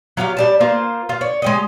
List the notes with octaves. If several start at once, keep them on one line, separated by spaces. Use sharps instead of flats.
F#3 F4 G4 F5
G3 D5 A5
A#3 F4 C5
F4
C#5 D5
G#3 G4 D#5